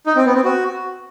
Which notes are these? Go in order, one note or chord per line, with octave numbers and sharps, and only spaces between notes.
D#4
C4
B3
C4
F#4